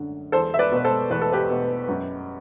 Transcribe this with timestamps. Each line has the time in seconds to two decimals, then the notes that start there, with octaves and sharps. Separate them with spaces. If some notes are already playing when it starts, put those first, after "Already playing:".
Already playing: F#2 D3
0.32 E2 A4 C5
0.54 E5
0.59 B4 D5
0.71 B2 B4
0.85 A4 C5
1.10 E2 B4
1.22 A4
1.32 G4 B4
1.49 B2
1.89 F#2